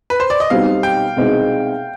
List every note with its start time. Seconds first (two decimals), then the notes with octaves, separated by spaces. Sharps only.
0.10 B4
0.20 C5
0.30 D5
0.40 D#5
0.50 B1 B2 G3 C4 D#4 F5
0.83 G5
1.17 C2 B2 G#3 C4 D#4